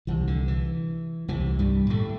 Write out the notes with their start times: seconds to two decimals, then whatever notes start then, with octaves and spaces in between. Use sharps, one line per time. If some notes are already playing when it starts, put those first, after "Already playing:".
0.07 C2 C3 E3
0.27 D3
0.48 E3
1.28 C2 C3 E3
1.59 G2 G3
1.90 A2 A3